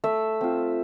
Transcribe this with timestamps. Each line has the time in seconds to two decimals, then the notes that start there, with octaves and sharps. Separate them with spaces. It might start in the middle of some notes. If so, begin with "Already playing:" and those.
0.04 A3 E5
0.41 C4 F4